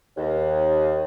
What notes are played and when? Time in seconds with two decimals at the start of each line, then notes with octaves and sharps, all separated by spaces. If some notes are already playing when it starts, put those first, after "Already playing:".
0.17 D#2